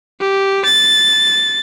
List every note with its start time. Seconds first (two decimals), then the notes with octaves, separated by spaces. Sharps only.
0.20 G4
0.65 A6